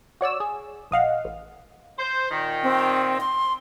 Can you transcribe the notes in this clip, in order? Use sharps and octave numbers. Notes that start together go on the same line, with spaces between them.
F#4 C#5 D5 E6
G#4
A#1 D#5 F5 F#5
A1
C5
A#2 D#3
C4
C6